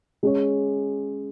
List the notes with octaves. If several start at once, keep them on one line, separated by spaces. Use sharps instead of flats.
G#3 C#4 G#4 C#5